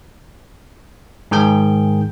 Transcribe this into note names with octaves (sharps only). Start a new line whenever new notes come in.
G#2 D#3 G#4 G5 G6